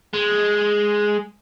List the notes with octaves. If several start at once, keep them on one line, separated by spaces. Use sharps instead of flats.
G#3